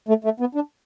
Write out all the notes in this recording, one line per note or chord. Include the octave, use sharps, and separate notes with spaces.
A3
A3
B3
D4